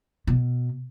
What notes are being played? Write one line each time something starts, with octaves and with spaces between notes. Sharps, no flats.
B2